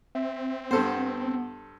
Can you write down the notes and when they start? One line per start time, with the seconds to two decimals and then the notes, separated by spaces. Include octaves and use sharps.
0.15 C4 E5
0.71 G2 B3 A4 C5